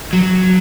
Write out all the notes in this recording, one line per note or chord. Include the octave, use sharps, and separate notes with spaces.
F#3